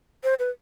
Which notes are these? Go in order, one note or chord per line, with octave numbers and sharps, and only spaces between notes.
C5
B4